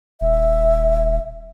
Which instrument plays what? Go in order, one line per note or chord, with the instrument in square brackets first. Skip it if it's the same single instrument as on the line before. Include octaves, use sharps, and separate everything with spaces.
[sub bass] D#1 [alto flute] E5